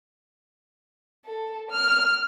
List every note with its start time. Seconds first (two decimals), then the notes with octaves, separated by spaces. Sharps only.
1.25 A4
1.70 F6